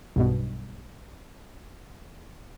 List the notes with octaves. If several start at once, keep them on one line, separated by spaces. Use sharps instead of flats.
B1 G2 B2